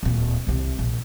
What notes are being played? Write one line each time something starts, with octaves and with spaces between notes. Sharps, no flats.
D1 A#2
C2 C3
A#1